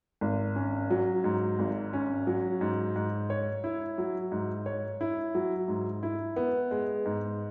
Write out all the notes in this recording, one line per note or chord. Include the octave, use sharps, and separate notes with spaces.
G#1
C#4
F#3
G#2
G#1
C#4
F#3
G#2
G#2
C#5
E4
F#3
G#2
C#5
E4
F#3
G#2
E4
B3
G#3
G#2